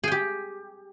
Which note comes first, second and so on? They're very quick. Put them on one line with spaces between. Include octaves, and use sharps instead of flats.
G#4 G5 G4